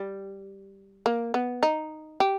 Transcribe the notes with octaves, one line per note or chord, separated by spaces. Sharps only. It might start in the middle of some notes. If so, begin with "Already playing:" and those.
Already playing: G3
A#3
B3
D#4
G4